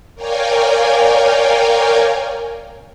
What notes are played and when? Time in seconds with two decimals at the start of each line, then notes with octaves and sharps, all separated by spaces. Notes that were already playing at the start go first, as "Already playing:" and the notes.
0.15 A#4 C#5 D5 F5 G5 G#5